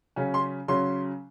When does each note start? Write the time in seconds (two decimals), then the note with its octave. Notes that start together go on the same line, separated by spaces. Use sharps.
0.16 C#3 F#3 C#4
0.34 C6
0.68 C#3 F#3 C#4 C6